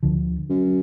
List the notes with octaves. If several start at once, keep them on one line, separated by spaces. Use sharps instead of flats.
D2 D3 F3
F#2